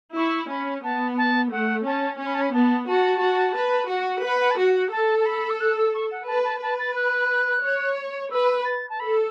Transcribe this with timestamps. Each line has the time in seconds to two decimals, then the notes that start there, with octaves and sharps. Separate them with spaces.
0.16 E4 C#6
0.50 C#4 B5
0.84 B3 A5
1.18 A5
1.52 A3 F#5
1.86 C#4 A5
2.20 C#4 C#6
2.27 B5
2.35 A5
2.41 B5
2.54 B3 A5
2.88 F#4 A5
3.22 F#4
3.56 B4
3.89 F#4
4.24 B4 F#5
4.41 F#5
4.51 A5
4.58 F#4 F#5
4.75 F#5
4.91 A4 A5
5.20 A5
5.26 B5
5.50 E6
5.60 F#6
5.77 E6
5.94 C#6
6.11 F#5
6.27 B4 A5
6.44 A5
6.61 B4 A5
6.79 A6
6.95 F#6
7.64 C#5
8.31 B4 E6
8.65 A6
8.89 A5
9.00 A4 B5